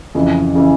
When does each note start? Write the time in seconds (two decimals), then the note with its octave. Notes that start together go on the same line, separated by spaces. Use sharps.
0.15 F2 C#3 E3
0.55 C#3 E3